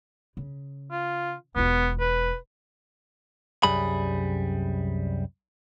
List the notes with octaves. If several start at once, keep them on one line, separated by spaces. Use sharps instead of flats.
C#3
F4
E1 B3 F4
B4
C2 F#2 G3 G#4 B5